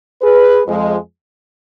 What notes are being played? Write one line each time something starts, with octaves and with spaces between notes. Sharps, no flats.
G#4 B4
F2 F3 G#3